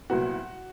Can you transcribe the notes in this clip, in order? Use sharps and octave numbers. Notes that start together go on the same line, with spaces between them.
C2 A#2 F#3 B3 F#4